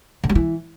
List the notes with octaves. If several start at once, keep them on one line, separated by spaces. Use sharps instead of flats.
D3
G3
E3